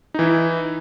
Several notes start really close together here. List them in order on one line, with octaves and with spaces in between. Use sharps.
D#4 E3 E4